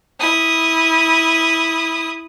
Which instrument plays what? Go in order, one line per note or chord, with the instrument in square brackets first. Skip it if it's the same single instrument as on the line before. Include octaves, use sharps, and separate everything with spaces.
[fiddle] E4 D#6